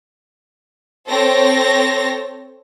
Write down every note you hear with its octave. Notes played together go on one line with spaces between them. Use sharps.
C4 A4 C5 C#5 A#6